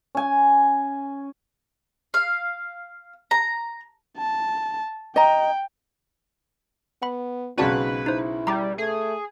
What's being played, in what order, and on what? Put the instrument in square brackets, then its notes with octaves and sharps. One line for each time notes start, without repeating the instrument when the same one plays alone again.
[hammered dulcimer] C#4 G#5
[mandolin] F5
A#5
[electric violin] A5
[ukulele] D#5 A#5 [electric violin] G5
[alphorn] B3 [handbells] F#5 B5
[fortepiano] B1 C#3 F#4 [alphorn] G#2 [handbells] C4 D5 A5 [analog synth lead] B4
[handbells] D#4 C5 [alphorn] E4
[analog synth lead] G3 [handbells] A#5 D6
[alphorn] A3 [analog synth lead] G#4